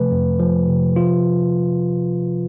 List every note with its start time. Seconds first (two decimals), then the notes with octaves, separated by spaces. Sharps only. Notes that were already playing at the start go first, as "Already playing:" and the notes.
Already playing: C3 F3 A3 B4
0.11 F2
0.40 F3
0.68 C3
0.96 F3 F4